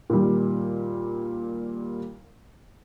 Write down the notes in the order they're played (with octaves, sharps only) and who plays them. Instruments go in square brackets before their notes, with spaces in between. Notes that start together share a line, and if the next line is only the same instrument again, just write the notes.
[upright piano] A#2 D#3 G3